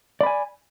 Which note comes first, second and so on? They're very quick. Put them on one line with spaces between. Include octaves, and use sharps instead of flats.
D5 B5 G#5